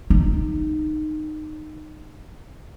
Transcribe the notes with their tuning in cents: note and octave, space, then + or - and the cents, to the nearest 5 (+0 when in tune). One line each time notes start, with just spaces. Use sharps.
D#4 -20